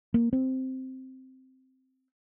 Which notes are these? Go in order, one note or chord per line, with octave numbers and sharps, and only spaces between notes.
A#3
C4